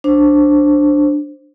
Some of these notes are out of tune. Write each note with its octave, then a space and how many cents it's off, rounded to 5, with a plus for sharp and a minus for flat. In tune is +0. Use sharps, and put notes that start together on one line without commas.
D4 +5 C5 +10